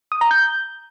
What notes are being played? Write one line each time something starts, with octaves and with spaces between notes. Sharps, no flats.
D#6
A#5
G6